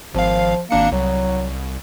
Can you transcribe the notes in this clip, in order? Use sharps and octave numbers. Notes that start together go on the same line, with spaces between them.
G#1 F3 F5
G#1 A#3 D4 C#7
C2 F#3